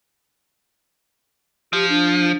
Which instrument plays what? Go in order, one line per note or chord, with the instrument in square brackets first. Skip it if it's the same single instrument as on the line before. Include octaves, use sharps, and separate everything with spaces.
[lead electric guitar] F3 [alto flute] G4
[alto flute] D4